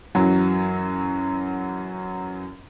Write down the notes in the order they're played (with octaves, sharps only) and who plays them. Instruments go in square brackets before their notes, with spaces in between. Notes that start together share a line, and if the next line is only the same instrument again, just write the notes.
[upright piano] F#2 E3 F#3